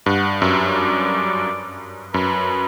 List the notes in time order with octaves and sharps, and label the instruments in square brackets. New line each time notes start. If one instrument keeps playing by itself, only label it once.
[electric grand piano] G2 [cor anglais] F#5
[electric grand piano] F#2 [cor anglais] E5
[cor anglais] D5
[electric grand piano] F#2 [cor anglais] B4